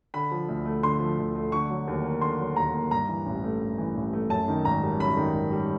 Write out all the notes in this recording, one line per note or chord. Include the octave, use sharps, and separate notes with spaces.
D3 B5
F3
D2
A3
D3 C6
F3
D2
A3
D3 C#6
F#3
D#2
A#3
D3 C6
F#3
D#2 A#5
A#3
G2 A#5
E3
A1
A3
G2
E3
A1
A3
F#2 A5
D#3
G#1 A#5
G3
F#2 B5
D#3
G#1
G3